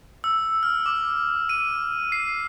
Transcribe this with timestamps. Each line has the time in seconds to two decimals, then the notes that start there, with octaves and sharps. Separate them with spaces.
0.24 E6
0.63 F6
0.86 D6
1.49 D#7
2.12 C7